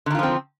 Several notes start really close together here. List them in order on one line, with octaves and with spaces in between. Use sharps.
D3 D#3 F4 F3 C4